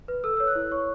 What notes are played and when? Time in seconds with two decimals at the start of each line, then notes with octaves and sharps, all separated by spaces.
0.08 B4
0.24 A4 E6
0.37 C#5 E6
0.47 F#6
0.55 E4
0.71 C#5 C#6